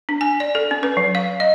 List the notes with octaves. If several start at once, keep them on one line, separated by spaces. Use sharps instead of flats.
D4
G#5
D5
A4
C#4
B4
F#3
F5
D#5